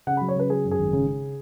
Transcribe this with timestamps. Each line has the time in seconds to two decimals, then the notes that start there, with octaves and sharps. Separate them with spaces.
0.07 C#3 F#5
0.17 B5
0.21 F#3
0.28 C#5
0.36 C#3 B4
0.50 F#3 G#4
0.65 F#2
0.71 G#4
0.79 G#1
0.93 C#3
1.07 C#3